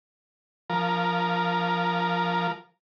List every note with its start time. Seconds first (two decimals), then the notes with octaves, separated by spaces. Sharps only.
0.70 F3 A#4